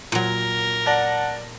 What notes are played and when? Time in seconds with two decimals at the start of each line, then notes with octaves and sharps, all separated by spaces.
0.12 A#2 F#3 A#4
0.86 D5 F#5 A5 A#6